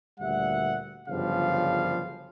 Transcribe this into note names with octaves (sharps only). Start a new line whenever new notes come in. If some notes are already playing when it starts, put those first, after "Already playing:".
D2 A#2 G3 E5 F#5
G1 F#2 C#3 F3 G3 F5